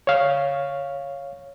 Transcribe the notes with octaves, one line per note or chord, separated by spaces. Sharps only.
C#5 F5